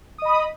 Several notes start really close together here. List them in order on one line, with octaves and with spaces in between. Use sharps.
D#6 D#5 B5